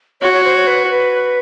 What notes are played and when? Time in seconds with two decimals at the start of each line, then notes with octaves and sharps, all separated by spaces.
0.21 F#4 C#5
0.33 C#5
0.45 C5
0.55 C#5
0.67 B4
0.91 B4